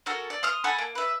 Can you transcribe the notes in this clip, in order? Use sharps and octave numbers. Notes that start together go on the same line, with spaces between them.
C#4 F#4 A4 A#4
D5
C6 D#6 F6
A4 F#5 G#5 B5
A#3
B4 E5